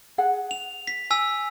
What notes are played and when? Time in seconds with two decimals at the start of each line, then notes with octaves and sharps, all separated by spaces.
0.18 G#4 F#5
0.51 F7
0.87 B6
1.11 G#5 E6 B6